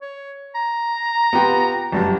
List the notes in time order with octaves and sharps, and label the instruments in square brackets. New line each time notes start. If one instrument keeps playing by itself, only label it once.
[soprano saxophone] C#5
A#5
[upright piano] B3 F4 G4
[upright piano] G1 F#2 G3 [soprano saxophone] A5